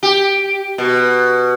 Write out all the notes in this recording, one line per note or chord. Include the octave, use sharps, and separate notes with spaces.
G4
B2